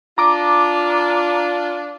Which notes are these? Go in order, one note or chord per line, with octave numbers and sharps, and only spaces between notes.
D4 F4 A#5 D6